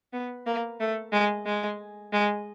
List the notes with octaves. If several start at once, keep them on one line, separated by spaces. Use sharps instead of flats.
B3
A#3
A3
G#3
G#3
G#3